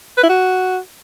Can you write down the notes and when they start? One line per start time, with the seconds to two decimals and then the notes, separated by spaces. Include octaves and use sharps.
0.17 B4
0.23 E4
0.29 F#4